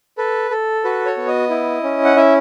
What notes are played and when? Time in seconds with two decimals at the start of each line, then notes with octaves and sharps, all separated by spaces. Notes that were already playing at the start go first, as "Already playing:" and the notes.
0.18 A4 B4
0.51 A4
0.84 F#4 B4
1.06 C#5
1.17 B3
1.28 D#5
1.50 E4
1.83 C#4
2.05 F#5
2.16 E4 E5